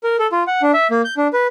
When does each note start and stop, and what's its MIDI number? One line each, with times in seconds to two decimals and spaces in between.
0.03 0.17 70
0.19 0.27 69
0.32 0.43 65
0.47 0.62 78
0.62 0.72 62
0.74 0.87 76
0.91 1.02 58
1.05 1.14 91
1.17 1.28 62
1.33 1.47 71